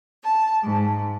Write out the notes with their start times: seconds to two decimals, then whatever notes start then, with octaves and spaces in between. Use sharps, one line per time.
0.23 A5
0.63 G#2